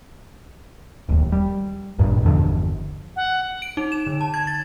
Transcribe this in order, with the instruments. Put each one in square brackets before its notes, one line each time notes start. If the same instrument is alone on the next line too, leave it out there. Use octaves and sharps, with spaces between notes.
[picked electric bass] D1 D#2
G3
G#1 C#2 G2 A#2
G1 E2 D3 F3
[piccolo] F#5
[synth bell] D7
D#4
E7
D3
A5
G#6
A6